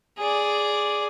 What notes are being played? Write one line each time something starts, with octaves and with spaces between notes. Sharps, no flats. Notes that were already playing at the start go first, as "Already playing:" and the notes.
G#4 D5